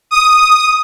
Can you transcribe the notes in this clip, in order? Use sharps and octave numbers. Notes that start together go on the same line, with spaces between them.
D#6